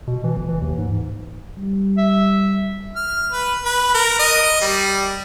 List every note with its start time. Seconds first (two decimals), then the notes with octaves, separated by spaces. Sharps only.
0.07 B2
0.24 E3
0.37 G1
0.49 E3
0.62 D#2
0.78 G#2
1.58 G3
1.98 E5
2.96 F6
3.32 B4
3.65 B4
3.95 A#4
4.19 D#5
4.61 G3